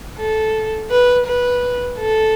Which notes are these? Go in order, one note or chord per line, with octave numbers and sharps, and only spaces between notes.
A4
B4
B4
A4